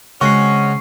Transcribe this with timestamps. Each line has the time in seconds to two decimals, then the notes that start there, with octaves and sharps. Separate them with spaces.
0.21 C#3 G#3 A#3 C4 C#4 F#4 C#6 C7